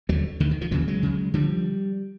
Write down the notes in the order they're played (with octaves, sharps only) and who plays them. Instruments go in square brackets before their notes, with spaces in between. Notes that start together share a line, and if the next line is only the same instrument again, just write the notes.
[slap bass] D#2 D3 E3 F#3
D2 D3 D#3
D#3
D#3 F3
D#2 C#3 E3 F#3
F#3 G#3
C#2 C#3
D3 F3 G3